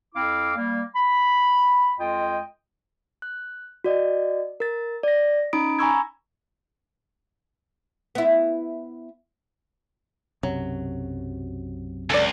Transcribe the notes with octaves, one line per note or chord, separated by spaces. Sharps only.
F2 C4 E4 F5 D6
G3 A#3
B5
F2 G#3 F4 D#5 G5
F#6
F#4 D5 D#5
A#4 A6
D5 A#6
C#4 D#4 A#5 B5 D#6 D7
G#5 A#5 B5 C#6 E6 G#6
B3 E4
B1 F#2 C3 F#3
C#2 A4 D5